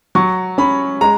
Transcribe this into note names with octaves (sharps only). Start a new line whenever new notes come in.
F#3 C#6
C#4 B5
G#3 A#5